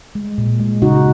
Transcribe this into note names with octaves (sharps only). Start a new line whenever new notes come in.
G#3
A#2
G#3
C#3 D#4 F#4